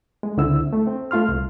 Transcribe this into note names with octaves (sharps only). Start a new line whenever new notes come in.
G#3
C#2 D3 C4 E4 E6
A3
C4
A3 F4 C6 F6
C2